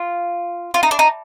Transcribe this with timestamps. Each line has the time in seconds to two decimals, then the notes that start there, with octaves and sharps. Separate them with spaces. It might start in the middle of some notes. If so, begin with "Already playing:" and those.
Already playing: F4
0.74 F4
0.83 D#4
0.91 D4
0.99 D#4